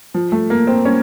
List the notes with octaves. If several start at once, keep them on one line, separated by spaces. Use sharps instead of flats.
F3
A3
A#3
C4
C#4